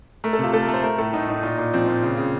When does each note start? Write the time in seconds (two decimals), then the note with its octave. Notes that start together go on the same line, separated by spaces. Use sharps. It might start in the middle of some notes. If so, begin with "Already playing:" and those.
0.24 A3 A#4
0.33 A4
0.38 C3
0.44 F4
0.53 A3 A4
0.63 A#4
0.68 A3
0.74 C5
0.83 A3 A#4
0.98 A2 A4
1.13 A2 D#4
1.28 A2 D#4
1.43 A#2 D#4
1.58 A#2
1.74 F3 C4
1.87 A#2
2.03 C#3
2.17 C#3